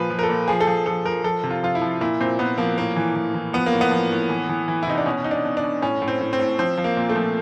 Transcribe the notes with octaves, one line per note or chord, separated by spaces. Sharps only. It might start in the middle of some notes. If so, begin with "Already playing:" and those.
Already playing: A#2 F3 B4
F3
A#4
A4
A#2
F3 G#4
A4
F3 G#4
F3 A4
F3 A#4
F3 A4
C3
F4
F3 F4
E4
F3
A#2 E4
A#2 C4
A#2 B3
F3 A#3
A2 A#3
E3
E3
E3
F3 B3
A#3
A2
B3
F3
A2
E3
E3
E3
E4
C3 D#4
D4
B2 C#4
B2 D#4
D4
B2
D4
B2
A2 C#4
A2
C4
A2
C4
A2
F3 C4
F3
A#3
A#2
A3
F3